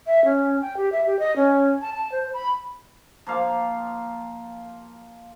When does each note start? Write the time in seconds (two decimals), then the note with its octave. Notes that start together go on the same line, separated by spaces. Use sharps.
0.07 E5
0.25 C#4
0.61 G5
0.77 G4
0.92 E5
1.06 G4
1.19 D#5
1.36 C#4
1.82 A5
1.93 A5
2.12 C5
2.34 B5
3.27 F3 A#3 F5